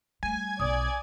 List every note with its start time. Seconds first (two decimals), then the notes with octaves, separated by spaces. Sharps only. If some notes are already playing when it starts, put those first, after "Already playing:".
0.23 G3 A3 G#5
0.60 B1 D5 D#6